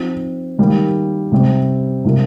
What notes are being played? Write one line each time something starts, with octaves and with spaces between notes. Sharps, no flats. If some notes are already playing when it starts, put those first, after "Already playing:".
Already playing: F3 C4 D#4
D#3 G3 A#3
C3 G3 C4
C3 G3 D4 F4 A#4